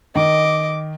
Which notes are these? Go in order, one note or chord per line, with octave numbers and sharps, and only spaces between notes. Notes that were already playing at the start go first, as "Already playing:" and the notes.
D#3 D#5 D6